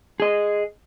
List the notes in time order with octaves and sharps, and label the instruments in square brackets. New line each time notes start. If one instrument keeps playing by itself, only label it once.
[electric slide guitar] G#4 D#5